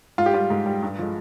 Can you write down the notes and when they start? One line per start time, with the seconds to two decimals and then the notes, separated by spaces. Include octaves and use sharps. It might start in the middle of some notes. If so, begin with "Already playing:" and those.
0.18 G#2 F4
0.26 G4
0.34 G3 F4
0.50 G#2
0.66 G3
0.82 G2
0.99 F3 G#3